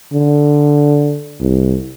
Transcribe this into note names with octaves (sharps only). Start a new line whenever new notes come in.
D3
C2